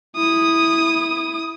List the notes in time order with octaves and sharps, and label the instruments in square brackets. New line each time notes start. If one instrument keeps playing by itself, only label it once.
[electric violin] E4 D#6